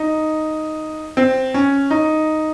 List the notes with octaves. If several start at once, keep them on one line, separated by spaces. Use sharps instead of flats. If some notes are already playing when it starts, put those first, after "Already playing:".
Already playing: D#4
C4
C#4
D#4